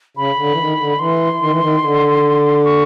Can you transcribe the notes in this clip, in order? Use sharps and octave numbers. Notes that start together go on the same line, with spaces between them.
C#3 B5
D3
E3
D#3
D3
E3 C6
D#3
E3
D#3
D3
C#6